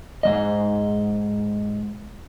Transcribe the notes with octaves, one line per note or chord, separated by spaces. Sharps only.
G#2 E3 D#5